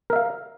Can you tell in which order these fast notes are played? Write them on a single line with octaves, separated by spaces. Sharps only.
A#4 E5 F5